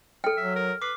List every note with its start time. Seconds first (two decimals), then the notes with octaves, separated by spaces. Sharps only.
0.24 A4 G5 F6
0.37 F#3 E5
0.56 A#4
0.82 B4 D6 C7